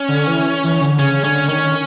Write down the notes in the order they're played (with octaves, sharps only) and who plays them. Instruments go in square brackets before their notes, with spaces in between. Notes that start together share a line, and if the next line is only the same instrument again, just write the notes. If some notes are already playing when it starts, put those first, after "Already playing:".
Already playing: [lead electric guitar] C#4
[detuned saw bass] D3
E3
E3
D3
[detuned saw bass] C#3 [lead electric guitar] C#4
[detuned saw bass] D3 [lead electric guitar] C#4
[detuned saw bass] D#3 [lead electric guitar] C#4